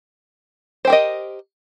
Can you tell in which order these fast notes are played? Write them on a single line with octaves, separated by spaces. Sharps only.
C5 G4 A#4 D#5